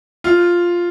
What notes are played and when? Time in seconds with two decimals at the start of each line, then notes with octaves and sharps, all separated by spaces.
0.24 F4